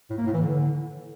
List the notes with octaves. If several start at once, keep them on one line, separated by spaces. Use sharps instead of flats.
A2
A#3
A2
E3
D3